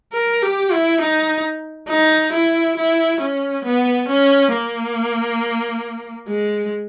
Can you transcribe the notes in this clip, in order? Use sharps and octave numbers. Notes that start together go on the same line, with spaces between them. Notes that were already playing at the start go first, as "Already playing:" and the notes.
A#4
G4
E4
D#4
D#4
E4
E4
C#4
B3
C#4
A#3
G#3